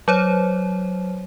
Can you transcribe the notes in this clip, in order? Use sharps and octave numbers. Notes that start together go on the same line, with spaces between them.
F#3 C5 C#5